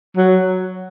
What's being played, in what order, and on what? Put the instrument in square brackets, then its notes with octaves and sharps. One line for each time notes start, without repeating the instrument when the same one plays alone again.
[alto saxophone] F#3